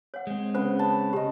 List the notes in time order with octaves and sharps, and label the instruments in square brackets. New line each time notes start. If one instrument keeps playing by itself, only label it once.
[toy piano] C#5 F#5
[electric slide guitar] G#3 C4
[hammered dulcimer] C#3 B3 [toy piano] C5
[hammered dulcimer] A5 B5
[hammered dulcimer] C#3 D#5 [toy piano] G4